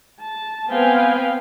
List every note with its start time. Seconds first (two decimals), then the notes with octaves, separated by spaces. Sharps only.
0.22 A5
0.69 B3 C4 B4 F5 G5 G#5